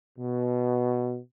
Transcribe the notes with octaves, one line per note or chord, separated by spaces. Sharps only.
B2